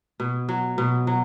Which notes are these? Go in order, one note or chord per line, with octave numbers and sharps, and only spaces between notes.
B2
F#3
B2
F#3